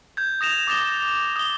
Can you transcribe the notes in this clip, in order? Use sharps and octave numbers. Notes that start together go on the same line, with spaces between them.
G6 G#6
D#6 A#6 E7 F7
D6 D#6 A6 A#6 E7 G7
D#6 G7